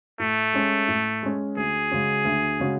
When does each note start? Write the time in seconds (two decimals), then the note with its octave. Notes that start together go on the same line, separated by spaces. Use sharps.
0.19 A2 A3
0.54 G#3 C#4
0.88 A2
1.23 G#3 C#4
1.57 D2 G#4
1.91 C#3 G#3 C#4 F#4
2.25 D2
2.60 C#3 G#3 C#4 F#4